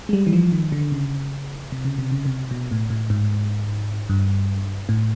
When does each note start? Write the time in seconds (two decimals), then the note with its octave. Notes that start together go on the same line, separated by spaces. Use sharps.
0.09 G#3
0.13 G3
0.27 E3
0.33 F3
0.52 D#3
0.72 D3
0.92 C#3
1.72 C3
1.85 C#3
1.98 C3
2.12 C#3
2.26 C3
2.51 B2
2.71 A2
2.90 A2
3.10 G#2
4.09 G2
4.89 A2